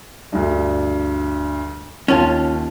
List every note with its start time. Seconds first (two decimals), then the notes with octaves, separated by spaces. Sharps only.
0.32 D2 G2
2.08 D#2 C#4 F4 A5